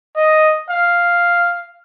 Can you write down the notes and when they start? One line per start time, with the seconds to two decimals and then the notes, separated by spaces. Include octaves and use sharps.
0.16 D#5
0.70 F5